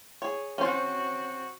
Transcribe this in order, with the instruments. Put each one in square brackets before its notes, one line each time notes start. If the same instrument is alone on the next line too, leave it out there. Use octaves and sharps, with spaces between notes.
[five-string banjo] G#4 C#5
[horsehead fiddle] C4 F#4 [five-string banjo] C#4 C5